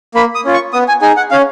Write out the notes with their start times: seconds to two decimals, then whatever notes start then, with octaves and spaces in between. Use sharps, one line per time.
0.15 A#3 B5
0.35 D#6
0.45 C#4 F4
0.54 C#6
0.73 B3 D#6
0.88 G#5
1.02 D#4 G#4 G#5
1.17 F#5
1.31 C#4 F5